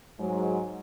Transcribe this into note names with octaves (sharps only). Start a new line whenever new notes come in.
G#2 F#3 G#3